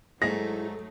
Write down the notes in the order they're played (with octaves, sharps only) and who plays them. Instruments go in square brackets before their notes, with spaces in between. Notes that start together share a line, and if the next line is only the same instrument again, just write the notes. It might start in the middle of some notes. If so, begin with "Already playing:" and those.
[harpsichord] G#2 [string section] F#3 A3 D#4 [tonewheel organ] E4 G#4 [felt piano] A#6